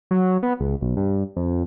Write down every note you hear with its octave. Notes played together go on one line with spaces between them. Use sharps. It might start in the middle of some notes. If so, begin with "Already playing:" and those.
F#3
B3
C#2
B1
G2
F2